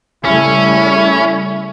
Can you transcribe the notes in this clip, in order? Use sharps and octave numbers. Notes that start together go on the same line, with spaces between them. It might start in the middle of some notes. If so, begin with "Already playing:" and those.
C#3 G3 A3 C#4 E4